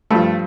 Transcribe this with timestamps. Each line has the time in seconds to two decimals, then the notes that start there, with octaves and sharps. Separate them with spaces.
0.11 G2 F3 A3